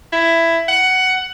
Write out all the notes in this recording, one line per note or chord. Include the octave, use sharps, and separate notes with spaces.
E4
F#5